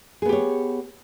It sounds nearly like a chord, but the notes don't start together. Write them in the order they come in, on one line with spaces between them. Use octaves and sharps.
G#4 B3 G4 C#5